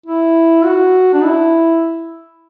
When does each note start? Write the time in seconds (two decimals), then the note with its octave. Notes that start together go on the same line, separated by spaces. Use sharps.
0.06 E4
0.65 F#4
1.13 D4
1.24 E4